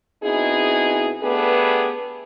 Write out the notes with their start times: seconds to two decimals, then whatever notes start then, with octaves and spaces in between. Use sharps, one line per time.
0.24 B2 C4 D#4 E4 G#4
1.22 A3 B3 D4 G4 G#4 B4